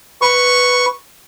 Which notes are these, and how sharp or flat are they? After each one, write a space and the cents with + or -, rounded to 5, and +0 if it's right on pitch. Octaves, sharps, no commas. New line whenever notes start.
B4 +0 C#6 +0